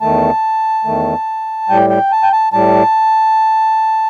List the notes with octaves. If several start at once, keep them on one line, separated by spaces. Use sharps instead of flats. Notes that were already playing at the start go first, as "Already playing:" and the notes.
E2 D#3 A3 A5
E2 D#3 A3
A2 G3 G5
G5
A5
G5
A5
A2 G3 A5